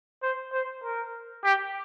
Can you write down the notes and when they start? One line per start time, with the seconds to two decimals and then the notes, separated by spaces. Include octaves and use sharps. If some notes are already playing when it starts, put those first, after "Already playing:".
0.22 C5
0.52 C5
0.83 A#4
1.44 G4